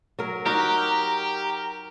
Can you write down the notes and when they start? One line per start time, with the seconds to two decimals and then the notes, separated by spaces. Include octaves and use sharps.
0.19 F#3 A#4
0.46 D#4 F#4 G4 A#4